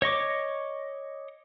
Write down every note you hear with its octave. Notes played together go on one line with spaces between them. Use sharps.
C#5 D#5 C#6 D6